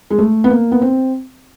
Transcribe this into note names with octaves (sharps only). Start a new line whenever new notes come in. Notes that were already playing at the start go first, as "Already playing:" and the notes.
G#3
A3
B3
A#3
B3
C4